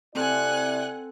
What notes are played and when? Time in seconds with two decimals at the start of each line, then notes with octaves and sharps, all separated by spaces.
0.15 C3 C4 E4 A4 D5 F#5 G#5 F#6